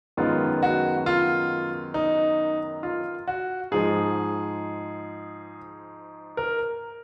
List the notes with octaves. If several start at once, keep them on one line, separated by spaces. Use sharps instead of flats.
F#2 D#3 G#3 B3 F4
F#4
F4
D#4
F4
F#4
G#2 F3 G#3 G#4
A#4